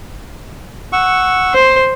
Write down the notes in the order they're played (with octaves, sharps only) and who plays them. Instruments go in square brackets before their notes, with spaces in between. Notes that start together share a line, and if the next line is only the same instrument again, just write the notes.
[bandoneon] F#5 C#6 E6
[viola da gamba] C5